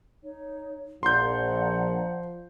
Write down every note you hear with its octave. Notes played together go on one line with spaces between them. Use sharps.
D#4 C#5
A#1 F3 D5 F#5 A#5 C6 G6